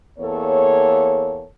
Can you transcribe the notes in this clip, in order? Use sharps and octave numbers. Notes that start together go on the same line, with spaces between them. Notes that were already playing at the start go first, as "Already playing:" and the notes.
E2 A#3 A4 C#5